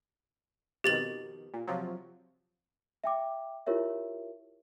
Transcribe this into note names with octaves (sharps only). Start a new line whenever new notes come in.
F2 B2 D#3 G4 A6 F#7
A#2
C3 F3 F#3
E5 G5 D6
E4 F4 G4 A#4 C#5 E5